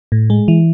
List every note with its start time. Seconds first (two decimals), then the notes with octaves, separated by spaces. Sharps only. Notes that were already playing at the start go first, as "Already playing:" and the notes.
0.12 A2
0.30 G#3
0.48 E3